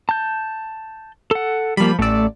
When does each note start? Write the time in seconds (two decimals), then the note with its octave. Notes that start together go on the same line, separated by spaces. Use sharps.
0.09 A5 G6
1.31 A4 F#5
1.77 F3 G3 A#3 B5
1.99 A1 A3 D5 E6